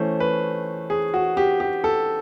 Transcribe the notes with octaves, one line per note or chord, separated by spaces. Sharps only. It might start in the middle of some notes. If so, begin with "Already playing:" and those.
Already playing: E3 A3 C#4 C5
B4
G#4
F#4
G4
G4
A4